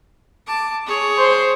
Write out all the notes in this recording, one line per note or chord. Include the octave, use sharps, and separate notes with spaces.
A5 D6
G#4 C#5
C5